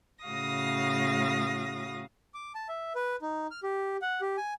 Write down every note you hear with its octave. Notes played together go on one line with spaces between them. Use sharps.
A2 C#3 F#4 F5 D#6 A#6
D6
A5
E5
B4
D#4
F6
G4
F#5
G4
G#5